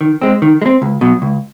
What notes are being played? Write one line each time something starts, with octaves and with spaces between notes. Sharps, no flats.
D#3
G#3 C4
D#3
G#3
C4
C#2
B2 F#3
C#2